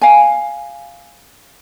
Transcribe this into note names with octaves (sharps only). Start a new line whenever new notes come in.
F5 G#5